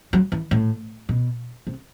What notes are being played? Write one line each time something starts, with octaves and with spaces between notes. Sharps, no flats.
F#3
E3
A2
B2
C3